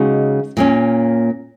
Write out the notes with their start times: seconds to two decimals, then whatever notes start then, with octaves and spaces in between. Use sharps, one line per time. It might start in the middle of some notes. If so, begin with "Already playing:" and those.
Already playing: C#3 G#3 D#4 F#4
0.57 A#2 A#3 C#4